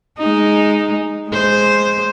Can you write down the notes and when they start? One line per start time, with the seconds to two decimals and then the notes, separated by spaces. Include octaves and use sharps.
0.19 G#3 D#4
1.29 G#3 C5